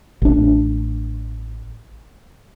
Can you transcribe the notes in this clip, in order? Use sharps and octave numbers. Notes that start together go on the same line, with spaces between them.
A1 D4